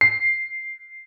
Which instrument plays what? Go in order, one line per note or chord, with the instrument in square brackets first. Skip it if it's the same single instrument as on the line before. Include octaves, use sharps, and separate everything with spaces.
[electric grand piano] C7